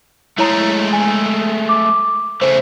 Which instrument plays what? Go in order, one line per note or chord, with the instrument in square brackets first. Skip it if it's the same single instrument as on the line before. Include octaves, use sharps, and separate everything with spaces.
[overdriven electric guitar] G#3 A3 [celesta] E4 C#5 A#5
[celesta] G#5
D6
[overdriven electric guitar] C#3 A3 [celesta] C5